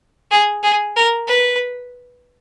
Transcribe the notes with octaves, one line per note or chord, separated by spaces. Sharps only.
G#4
G#4
A#4
B4